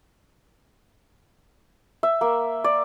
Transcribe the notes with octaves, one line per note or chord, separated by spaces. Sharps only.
E5
A#3
D5